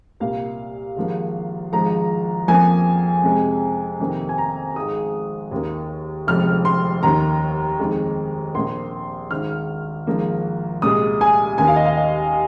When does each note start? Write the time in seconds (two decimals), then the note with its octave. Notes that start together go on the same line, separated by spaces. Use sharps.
0.20 C2 A#2 A#3 F5
0.97 G#1 G#2 F3 A#3
1.72 G#1 G#2 F3 G#3 A#5
2.48 F2 F3 A#3 G#5
3.24 F2 C3 G#3
4.00 F2 C3 D#3 A#3
4.29 G#5
4.38 A#5
4.76 G#1 G#2 G#3 D#6
5.51 D#2 D#3 A#3
6.27 F1 F2 F3 G#3 F6
6.65 C6
7.03 D#2 D#3 A#3 A#5
7.79 F2 D#3 G#3
8.55 A#1 A#2 A#3 C6
9.31 G#1 G#2 D#3 F6
10.07 G#1 G#2 F3 A#3
10.82 C2 A#2 G#3 D#6
11.21 G#5
11.58 D#2 D#3 A#3 G#5
11.67 F5
11.76 D#5
11.86 F5
11.97 D#5